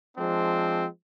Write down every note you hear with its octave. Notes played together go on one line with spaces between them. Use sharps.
F3 G#3 C4 D4